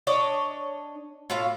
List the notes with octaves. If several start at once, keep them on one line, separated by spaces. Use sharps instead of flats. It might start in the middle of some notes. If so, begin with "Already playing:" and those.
D4 C#5 D#5
A2 F4 F5